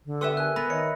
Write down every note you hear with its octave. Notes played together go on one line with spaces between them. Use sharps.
D3
B3 G4 A4 E5 C6 E6
A#4 G#5 F#6
B3 B5 A#6
D#3 C#5 D#5 E5 C#7